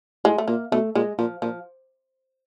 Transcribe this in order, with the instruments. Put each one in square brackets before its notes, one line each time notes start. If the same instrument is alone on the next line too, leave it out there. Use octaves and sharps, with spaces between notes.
[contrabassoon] A2 [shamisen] G#3
[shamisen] A3
[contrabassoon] A#2 [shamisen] A#3
[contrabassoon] B2 [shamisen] A3
[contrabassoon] A#2 [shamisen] G#3
[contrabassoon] A#2 [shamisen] F3
[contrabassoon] A#2 [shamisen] F3